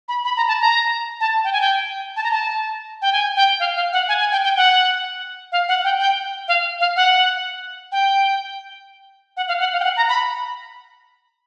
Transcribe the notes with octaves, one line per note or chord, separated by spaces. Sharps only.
B5
B5
A#5
A5
A#5
A5
G5
G#5
G5
A5
A#5
A5
G5
G#5
G5
F5
F5
F#5
G#5
G#5
G5
G5
F#5
F5
F#5
G5
G5
F5
F5
F#5
G5
F#5
F5
F#5
F5
G5
F#5
A#5
B5